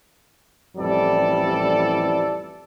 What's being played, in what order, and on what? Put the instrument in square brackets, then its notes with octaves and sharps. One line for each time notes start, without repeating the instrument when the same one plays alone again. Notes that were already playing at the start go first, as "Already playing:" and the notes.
[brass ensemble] A1 F2 E3 G3 A4 D5